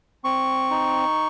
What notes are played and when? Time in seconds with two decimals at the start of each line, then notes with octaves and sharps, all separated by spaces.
0.24 C4 C#6
0.71 D#4